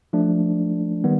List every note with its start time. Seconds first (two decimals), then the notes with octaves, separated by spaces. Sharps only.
0.13 F3 A3 D4
1.04 D#3 G3 B3